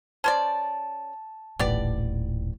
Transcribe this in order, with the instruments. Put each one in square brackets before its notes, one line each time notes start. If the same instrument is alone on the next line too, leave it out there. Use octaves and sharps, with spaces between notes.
[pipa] C#4 C5 D5 [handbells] A5
[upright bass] D#1 A1 [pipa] B3 G4 D5